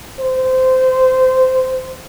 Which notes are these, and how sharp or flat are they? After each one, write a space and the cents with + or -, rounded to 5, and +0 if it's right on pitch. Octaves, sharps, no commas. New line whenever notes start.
C5 -20